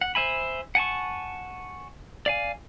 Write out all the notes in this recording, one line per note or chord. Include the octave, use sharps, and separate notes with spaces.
F#5
C5 E5 G#5 B5
F#5 G#5 A5 C#6
D5 F5 G#5